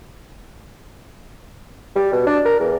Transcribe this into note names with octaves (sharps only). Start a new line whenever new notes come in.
G3
B2
D4
A#4
E2